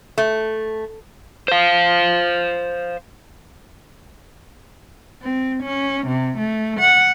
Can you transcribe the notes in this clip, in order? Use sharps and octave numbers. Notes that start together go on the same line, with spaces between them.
A3
C5 F5
C4
C#4
C3
A3
F#5